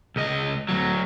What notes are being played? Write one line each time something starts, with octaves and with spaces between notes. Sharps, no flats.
C#2 D#5
D2 F#3